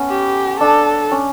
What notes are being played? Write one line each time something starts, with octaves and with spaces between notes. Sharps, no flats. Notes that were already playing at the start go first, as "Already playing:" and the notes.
Already playing: A3 B3 C#4
G4
D4 A4
C#4